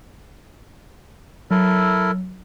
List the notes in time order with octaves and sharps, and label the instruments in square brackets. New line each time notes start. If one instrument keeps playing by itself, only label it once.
[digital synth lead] F#3 [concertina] E4 A4 A#4